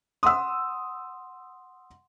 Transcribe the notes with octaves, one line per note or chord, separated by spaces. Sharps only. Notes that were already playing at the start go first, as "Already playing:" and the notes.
F#5 C6 D#6 E6